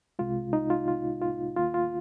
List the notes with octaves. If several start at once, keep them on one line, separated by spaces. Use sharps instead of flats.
C2 C3 G#3 F4
D#4
F4
F4
F4
D#2 D#3 A#3 F4
F4